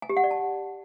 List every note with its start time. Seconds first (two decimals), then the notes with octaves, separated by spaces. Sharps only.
0.02 G#5
0.09 G4
0.17 F#5
0.24 D5
0.31 A5